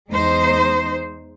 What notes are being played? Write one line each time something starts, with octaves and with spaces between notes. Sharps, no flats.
E2 G#3 D#4 C5